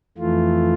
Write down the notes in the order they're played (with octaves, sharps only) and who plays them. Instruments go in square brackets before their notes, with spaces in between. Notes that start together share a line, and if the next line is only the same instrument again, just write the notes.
[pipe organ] F2 E3 A3 F4